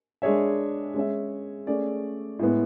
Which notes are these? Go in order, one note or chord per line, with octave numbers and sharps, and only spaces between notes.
G#3 D4 G#4 C#5 E5
G#3 C#4 G#4 C#5 E5
A3 C#4 G#4 D5
A2 G#3 B3